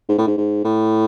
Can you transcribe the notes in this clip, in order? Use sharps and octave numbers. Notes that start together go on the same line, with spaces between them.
G#2
A2
G#2
G#2
A2